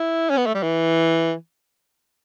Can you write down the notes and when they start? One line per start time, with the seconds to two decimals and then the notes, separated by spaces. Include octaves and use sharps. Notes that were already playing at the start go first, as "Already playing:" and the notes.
Already playing: E4
0.30 C#4
0.37 B3
0.46 A3
0.55 G3
0.63 E3